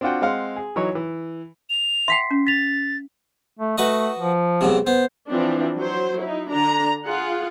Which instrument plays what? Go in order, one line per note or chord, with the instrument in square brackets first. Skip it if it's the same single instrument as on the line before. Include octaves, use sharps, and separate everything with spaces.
[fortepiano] C4 D4 F4 F#4 F#5 G5
G#3 C4 F5 F#5
G#4
E3 F#3 D#4 C#5
E3
[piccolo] F7
[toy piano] E5 F#5 G5 [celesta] C6 B6 C7
[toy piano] C#4
[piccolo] A6 [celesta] B6 F7
[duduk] A3
[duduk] A3 [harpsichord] F#4 B4 D#5
[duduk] F3
[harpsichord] B1 G#2 C3
[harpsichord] B3 [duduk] C5
[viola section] E3 F3 C4 D4
F#3 C5
D#4 E4
D3 D4 A#5
F4 G#4 F#5